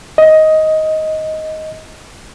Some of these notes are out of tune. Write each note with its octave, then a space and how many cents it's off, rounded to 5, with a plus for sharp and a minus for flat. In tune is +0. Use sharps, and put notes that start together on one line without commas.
D#5 +10